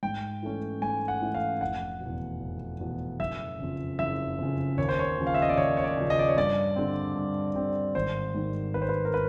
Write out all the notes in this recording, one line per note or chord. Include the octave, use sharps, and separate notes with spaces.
G#2 G5
E3 A3 C#4
G#2 G#5
F#5
E3 A3 C#4
F5
F1 F#5
B2
E2
F1
E2 B2
F#1 E5
F2 C#3
F#1 E5
F2 C#3
D#2 C#5
C5
C#5
C#3 F3
F5
E5
D#5
D5
D#2 C#5
C#5
D5
C#3 F3
D#5
D5
C#5
G2 D5
D3 G3 C4
G2
D3 G3 C4
G#1 C5
G#2 D#3 G3
G#1 B4
C5
B4
A#4
B4